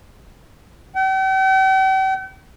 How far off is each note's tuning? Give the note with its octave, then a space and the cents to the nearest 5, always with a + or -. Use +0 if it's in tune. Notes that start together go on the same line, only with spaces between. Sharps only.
G5 -45